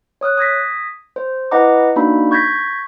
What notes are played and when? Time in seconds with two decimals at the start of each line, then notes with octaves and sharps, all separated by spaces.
0.21 C#5 D#6 F6 F#6
0.37 D#6 G#6 A#6 B6
1.16 C5
1.51 E4 B4 D#5 F#5 A#5 D6
1.96 A#3 D4 D#4 F#4 B5
2.31 C#6 G6 G#6 A#6 B6